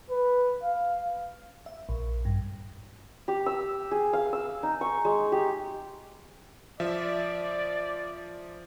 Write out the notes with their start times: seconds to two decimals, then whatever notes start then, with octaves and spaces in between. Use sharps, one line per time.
0.10 B4
0.64 F5
1.66 E5
1.89 A#1
2.25 G2
3.28 G4
3.46 E6
3.91 G#4
4.13 F5
4.33 E6
4.63 D#4
4.81 C#6
5.05 G#3
5.32 G4
6.80 F3 D5 E5